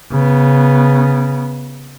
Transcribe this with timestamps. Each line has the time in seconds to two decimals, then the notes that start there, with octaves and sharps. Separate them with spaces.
0.12 C#3 B3